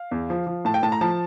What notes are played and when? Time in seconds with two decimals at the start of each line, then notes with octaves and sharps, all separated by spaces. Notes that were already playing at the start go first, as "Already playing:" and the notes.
Already playing: F5
0.11 E2
0.30 F3
0.47 F3
0.65 A2 A5
0.74 G5
0.83 A2 A5
0.92 A#5
1.01 F3 A5